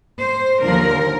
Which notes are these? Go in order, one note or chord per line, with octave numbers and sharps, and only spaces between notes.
C5
D#2 D3 F3 A#4